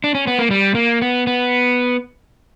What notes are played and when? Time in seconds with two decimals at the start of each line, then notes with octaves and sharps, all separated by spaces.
0.04 D4
0.15 C#4
0.27 B3
0.39 A#3
0.51 G3
0.75 A#3
1.02 B3
1.27 B3